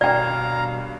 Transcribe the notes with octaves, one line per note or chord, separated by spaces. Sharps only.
D#1 G2 B2 A#4 D5 F5 G5 A#5